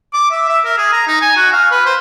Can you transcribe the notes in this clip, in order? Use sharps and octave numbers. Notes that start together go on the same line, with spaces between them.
D6
E5
E5
A#4
G#4
A#5
D#4
G#5
F#4
F5
B4
C5